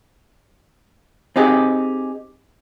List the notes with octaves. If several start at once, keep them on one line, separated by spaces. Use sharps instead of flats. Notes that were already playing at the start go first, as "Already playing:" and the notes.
C4 D#4 G4 G#4